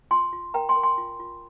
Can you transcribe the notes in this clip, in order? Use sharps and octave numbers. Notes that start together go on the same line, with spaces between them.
F4 G#5 C6
F4
A#4 G5 A#5
G#5 C6
A#4
G#5 C6
F4
F4